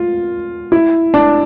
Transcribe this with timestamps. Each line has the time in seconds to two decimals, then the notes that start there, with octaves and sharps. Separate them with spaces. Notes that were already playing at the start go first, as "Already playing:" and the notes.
Already playing: F4
0.72 E4
1.14 D4